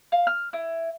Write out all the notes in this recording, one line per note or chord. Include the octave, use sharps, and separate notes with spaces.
F5
F6
E4